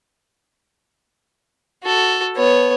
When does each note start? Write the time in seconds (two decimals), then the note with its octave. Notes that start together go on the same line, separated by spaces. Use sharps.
1.83 F#4 A4
2.36 B3 C#5